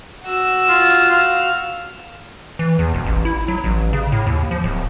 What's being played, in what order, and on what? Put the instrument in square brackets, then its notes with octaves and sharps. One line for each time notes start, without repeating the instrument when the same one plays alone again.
[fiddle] F#4 E6
[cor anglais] F4
F5
[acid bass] E3
E2
E1
A1
E4
F#3
A1
C#3
A2
D#2
F3
D1